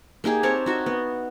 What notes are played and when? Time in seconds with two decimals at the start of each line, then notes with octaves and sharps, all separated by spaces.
0.24 A#3 D#4 G4 G#4
0.43 C4 A#4 C#5 A5
0.66 D#4 F#4 E5
0.86 B3